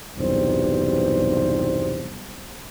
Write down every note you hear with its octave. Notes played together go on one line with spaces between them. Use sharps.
B1 E2 G2 C3 G3 C5